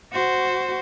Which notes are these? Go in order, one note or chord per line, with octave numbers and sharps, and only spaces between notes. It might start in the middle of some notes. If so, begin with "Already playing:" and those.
F#4 C5